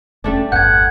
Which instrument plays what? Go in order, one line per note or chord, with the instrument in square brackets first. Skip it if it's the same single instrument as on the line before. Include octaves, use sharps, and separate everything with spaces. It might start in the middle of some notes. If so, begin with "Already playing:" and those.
[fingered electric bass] F1 C#4 [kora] G3 A3 D4
[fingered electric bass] G1 E2 [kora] B4 [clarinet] F#5 [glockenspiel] G6 G#6